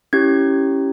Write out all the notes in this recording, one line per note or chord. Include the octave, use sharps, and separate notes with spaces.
C#4 E4 G4 G#6